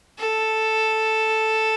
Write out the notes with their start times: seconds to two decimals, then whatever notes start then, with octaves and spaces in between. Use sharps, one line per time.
0.18 A4